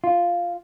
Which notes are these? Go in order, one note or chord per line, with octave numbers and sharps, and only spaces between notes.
F4